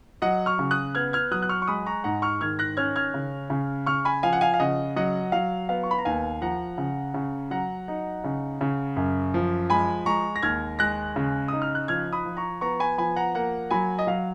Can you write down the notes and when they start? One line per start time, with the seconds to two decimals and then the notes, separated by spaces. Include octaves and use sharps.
0.22 F#3 D#5 F#5
0.46 C#6 F6
0.59 C#3
0.71 D#6 F#6
0.95 B3 F6 G#6
1.13 F6 G#6
1.31 F#3 D#6 F#6
1.42 F#6
1.49 C#6 F6
1.62 C#6
1.68 G#3 B5 D#6
1.86 A#5 C#6
2.04 G#2 F#5 A#5
2.22 C#6 F6
2.41 D#3 F6 G#6
2.59 F#6 A#6
2.77 C#4 F6 G#6
2.96 F6 G#6
3.14 C#3
3.50 C#3
3.86 C#3 C#6 F6
4.05 G#5 B5
4.23 F3 F5 G#5
4.33 F#5
4.41 F5 G#5
4.54 F5
4.60 C#3 D#5 F#5
4.96 F#3 D#5 F#5
5.32 F#3 F5
5.69 B3 F5
5.83 C#6
5.91 B5
5.98 A#5
6.05 D#2 F5 G#5
6.41 F3 F#5 A#5
6.78 C#3
7.14 C#3
7.51 F#3 F#5 A#5
7.88 D#4
8.24 C#3
8.61 C#3
8.96 F#2
9.34 F3
9.70 G#3 G#5 B5
10.06 G#3 A#5 C#6
10.36 A#6
10.43 D#2 F6 G#6
10.79 G#3 F#6 A#6
11.16 C#3
11.48 D#4 D#6
11.62 F6
11.75 F#6
11.88 F3 F6 G#6
12.13 B5 D#6
12.25 F3
12.37 A#5 C#6
12.61 B3 A#5 C#6
12.80 G#5 B5
12.98 F3 G#5 B5
13.16 F#5 A#5
13.35 A#3 F#5 A#5
13.71 F#3 G#5 B5
13.99 D#5
14.07 F#3 F5